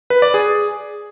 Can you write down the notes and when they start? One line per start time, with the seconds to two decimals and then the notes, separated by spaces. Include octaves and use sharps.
0.10 B4
0.22 D5
0.34 G#4